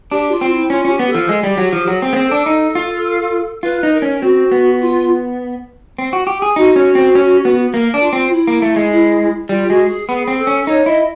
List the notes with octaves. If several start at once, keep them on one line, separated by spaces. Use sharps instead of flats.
D4 G4
F4
C4
E4
C#4 F4
C#4 G4
B3
F3 A4
G#3
G3 G4
F#3
G4
F3
F#3 G#4
C4 G#4
B3
C4
A4
D4
D#4
F4
F4 B4
D#4
A#4
C#4
C4 F#4
B3
F4
C4
F#4
G4
G#4
D#4 F#4
C#4
C4
C#4
B3
A#3 A#4
D4
F4
C4
E4
A#3
A3
G#3
E4
G3 F4
G#3 F#4
G#4
B3 G#4
C4
A4
C#4
D#4 C#5
E4 D#5